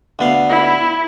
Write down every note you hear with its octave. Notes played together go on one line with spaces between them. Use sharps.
D2 B3 F5
E4